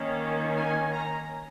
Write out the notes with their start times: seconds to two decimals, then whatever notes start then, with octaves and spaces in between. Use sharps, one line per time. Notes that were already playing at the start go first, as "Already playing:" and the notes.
Already playing: D#3 A#3 C#4
0.57 G#5
0.93 A#5